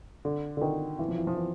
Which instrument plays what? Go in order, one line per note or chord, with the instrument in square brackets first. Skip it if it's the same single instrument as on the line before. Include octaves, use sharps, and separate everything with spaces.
[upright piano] D3
D3
D#3
E3
F3
E3
F3
E3